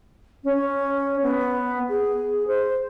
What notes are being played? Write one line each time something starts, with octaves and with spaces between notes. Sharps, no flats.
C#4
B3
G#4
C5